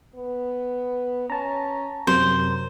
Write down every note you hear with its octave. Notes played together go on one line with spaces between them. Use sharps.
B3
C#4 A5 A#5
F#2 C3 F#3 A#4 C5